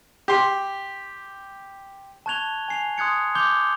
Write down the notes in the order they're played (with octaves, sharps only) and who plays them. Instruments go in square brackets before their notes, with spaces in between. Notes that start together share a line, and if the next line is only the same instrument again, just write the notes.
[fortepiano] G4 C6
[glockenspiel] A5 C#6 F#6 G#6 F7 G7
G#5 C7 F7
C6 D#6 F#6 G#6 C#7
C6 D6 G6 F7 G7